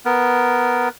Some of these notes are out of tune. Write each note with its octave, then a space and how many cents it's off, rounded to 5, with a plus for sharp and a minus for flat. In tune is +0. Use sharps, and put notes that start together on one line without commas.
B3 +0 A#4 +0